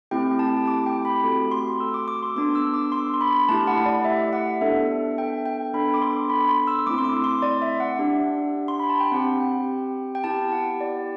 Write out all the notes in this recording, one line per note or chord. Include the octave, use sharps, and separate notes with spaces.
A3 C4 E4 G4 G5
A5
D6
G5
B5
A3 C4 F#4 A4
C6
E6
D6
D6
C6
B3 D4 A4 D6
E6
D6
C6
C6
B5
A3 E4 G4 A5
F#5
D5
E5
F#5
B3 D4 A4 E5
G5
G5
B3 D4 A4 B5
D6
C6
B5
C6
E6
A3 C4 E4 D6
C6
D6
C6
D5
E5
F#5
D4 G4
C6
B5
A5
G5
C4 G4 F#5
G5
G5
B3 E4 G4 A5
F#5
D5